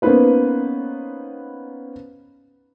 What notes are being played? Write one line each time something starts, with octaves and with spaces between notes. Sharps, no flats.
A#3 B3 C#4 D#4 B4 C5